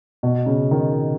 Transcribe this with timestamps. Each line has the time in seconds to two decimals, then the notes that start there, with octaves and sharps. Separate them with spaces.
0.23 B2
0.46 C#3
0.71 D#3